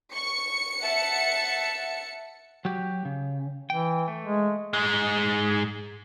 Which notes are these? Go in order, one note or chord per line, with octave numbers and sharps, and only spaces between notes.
C#6 C#7
E5 F#5 A5
F#3 F#4 G4
C#3
E3 G5
A3
G#3
G#2 G#3